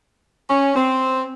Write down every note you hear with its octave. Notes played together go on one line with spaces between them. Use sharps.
C#4
C4